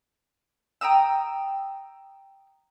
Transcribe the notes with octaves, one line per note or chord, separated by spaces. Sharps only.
G5 A#5 D#6 E6